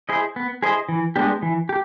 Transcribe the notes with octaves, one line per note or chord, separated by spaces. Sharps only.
E4 G#4 C5 D#5
B3
E4 G#4 C5 D#5
E3
G#3 B3 D4 G4
E3
G4